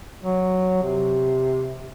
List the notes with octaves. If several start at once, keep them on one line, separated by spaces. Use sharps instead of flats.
F#3
C3